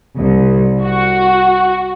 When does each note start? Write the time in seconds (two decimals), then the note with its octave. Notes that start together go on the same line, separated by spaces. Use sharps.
0.18 C2
0.83 F#4